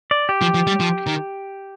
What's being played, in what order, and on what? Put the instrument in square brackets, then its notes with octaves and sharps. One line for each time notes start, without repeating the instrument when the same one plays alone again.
[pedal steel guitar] D5
G4
[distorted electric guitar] F3
F3
G3
F3
D#3